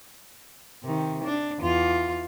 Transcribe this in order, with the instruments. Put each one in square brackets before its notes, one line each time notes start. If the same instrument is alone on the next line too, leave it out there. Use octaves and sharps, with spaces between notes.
[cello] C3 D#3
D4
E2 F4